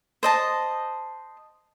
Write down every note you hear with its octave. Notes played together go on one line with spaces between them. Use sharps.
C5 D#5 A5